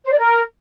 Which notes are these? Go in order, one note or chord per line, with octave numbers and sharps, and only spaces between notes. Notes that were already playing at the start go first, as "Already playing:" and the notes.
C5
D5
A#4